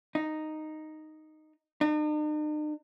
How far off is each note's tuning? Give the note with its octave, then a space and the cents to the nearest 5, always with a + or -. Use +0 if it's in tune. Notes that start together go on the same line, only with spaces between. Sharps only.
D#4 -5
D#4 -45